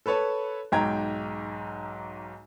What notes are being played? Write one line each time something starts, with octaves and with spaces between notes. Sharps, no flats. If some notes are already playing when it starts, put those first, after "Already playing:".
A4 B4 C#5 A5 B5
B1 G#2 G5 A#5 G#6